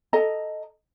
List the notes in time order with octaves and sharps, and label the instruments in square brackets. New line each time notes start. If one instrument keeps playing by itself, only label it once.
[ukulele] A4 D#5 A#5